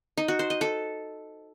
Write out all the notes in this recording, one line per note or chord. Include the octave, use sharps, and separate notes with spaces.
D#4
F#4
C5
D#5
A4